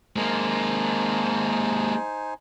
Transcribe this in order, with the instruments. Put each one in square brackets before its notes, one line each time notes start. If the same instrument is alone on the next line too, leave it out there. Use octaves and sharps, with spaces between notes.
[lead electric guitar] G#3 A#3 [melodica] D#4 C5 G#5